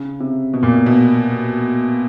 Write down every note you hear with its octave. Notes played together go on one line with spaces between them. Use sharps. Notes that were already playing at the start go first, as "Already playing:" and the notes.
Already playing: C#3
C3
B2
A#2
B2
B2